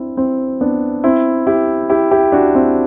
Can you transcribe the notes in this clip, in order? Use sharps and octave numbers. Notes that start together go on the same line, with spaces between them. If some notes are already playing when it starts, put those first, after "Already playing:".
Already playing: C4 D4 E4
C4 E4
B3 D4
C4 E4
E4 G4
E4 G4
E4 G4
D4 F#4
C4 E4